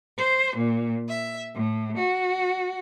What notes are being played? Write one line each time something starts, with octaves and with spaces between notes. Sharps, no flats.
C5
A#2
E5
A2
F#4